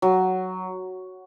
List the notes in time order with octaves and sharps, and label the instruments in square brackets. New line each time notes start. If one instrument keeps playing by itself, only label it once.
[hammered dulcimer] F#3